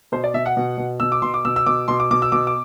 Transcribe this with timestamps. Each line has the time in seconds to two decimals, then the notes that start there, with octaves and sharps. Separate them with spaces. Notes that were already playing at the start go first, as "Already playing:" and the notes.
0.12 B2 C5
0.24 D5
0.34 B2 E5
0.46 F#5
0.57 B2
0.78 B2
1.00 B2 E6
1.12 D6
1.22 B2 C6
1.34 D6
1.45 B2 E6
1.56 E6
1.66 B2 D6
1.88 B2 C6
2.00 D6
2.11 B2 D6
2.22 E6
2.32 B2 D6
2.47 D6